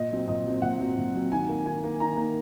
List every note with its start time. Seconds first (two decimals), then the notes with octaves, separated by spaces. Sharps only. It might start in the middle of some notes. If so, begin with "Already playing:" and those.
Already playing: A#2 D#5
0.11 F#3 C4
0.28 A#2 D#5
0.45 F#3 C4
0.62 A#2 F#5
0.79 F#3 C4
0.97 A#2
1.14 F#3 C4
1.31 D#3 G#5
1.49 A#3
1.66 D#3 G#5
1.84 A#3
2.00 D#3 A#5
2.17 A#3